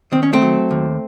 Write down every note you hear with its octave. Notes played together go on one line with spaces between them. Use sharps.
D#3 C4
C#4
A3 C4
F#3
D#2